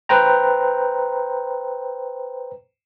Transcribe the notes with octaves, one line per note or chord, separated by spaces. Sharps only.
B4 C5 G5 A#5